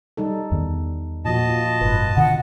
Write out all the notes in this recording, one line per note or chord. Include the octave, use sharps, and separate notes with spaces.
G3 D#4 A4
E2 D#3 B3
A#2 F3 F#4 D#5 A5
F4
F#1 G#2 B4
B2 D3 D#3 F#5